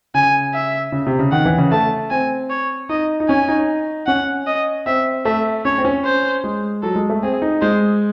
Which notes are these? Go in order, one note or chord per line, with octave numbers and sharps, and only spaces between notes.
C#3 G#5
E5
C#3
C3
C#3
D#3 F#5
E3
C#3
A3 A5
C4 G#5
C#5
D#4 D#5
D#4
C#4 G#5
D#4
C#4 F#5
D#5
C4 E5
A3 E5
C#4 C#5
C4
C#4
C5
G#3
F#3 A4
G#3
A3
C4 G#4
D#4
G#3 C5